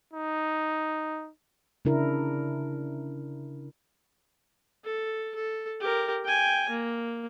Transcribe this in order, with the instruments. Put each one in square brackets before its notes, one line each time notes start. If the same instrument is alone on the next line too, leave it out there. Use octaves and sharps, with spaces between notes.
[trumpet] D#4
[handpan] C#3 D4 E4 A#4
[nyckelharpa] A4
A4
G4 A#4
G5 G#5
A#3